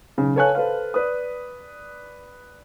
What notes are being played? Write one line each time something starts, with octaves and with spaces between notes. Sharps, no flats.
B1 C#3
A4 B4 C#5 F5 G#5 F#6
A4 B4 C5 F5
B4 D5 D#6